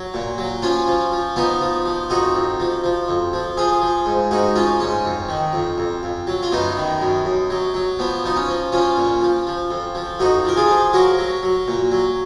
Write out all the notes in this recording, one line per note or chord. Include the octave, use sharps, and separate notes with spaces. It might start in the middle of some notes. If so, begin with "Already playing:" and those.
Already playing: F#3
A#2
F#3
F3 C#4 F4
F3
F3
F3 B3 D#4
F3
F3
F2 D#4 F#4
F2
F3
F3
F2
F3
F3 F4 G#4
F3
G#2
G#2 D#4 F#4
F3 C#4 F4
G#2 C#4
F2
D#3
F2
F2
F2
F#3
F4
F#2 B3 D#4
D#3
F#2
F#2
F#3
F#3
F3 B3
F3 D#4
C#4
F3
F3 C#4 F4
A#2
F3
F3
F2
F3
F2 D#4 F#4
F3 A#4
F4 G#4
F3
F#3 F#4 A#4
F#3
F#3
A#2
F#3